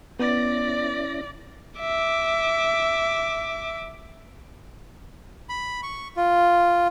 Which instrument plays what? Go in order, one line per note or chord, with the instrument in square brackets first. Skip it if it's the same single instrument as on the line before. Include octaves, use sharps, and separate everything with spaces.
[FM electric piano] B3 [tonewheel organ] C#4 E4 A#6 [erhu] D5
[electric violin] E5 D6
[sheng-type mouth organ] B5
C#6
F4